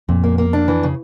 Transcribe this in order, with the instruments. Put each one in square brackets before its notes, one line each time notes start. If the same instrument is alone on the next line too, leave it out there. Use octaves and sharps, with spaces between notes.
[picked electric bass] F2 [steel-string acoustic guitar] A#2
[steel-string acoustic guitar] A#3
A#3
D4
E3
C#3